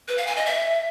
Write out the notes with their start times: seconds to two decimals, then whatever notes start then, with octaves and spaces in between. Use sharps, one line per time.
0.08 B4
0.18 F5
0.27 G#5
0.36 D#5
0.46 E5